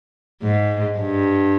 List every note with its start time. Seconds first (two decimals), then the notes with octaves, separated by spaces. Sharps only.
0.43 G#2
0.98 G2